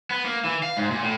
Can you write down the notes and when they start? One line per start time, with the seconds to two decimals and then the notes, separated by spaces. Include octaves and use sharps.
0.11 B3
0.25 A#3
0.44 E3
0.63 F5
0.77 G#2
0.91 A#2
1.03 A2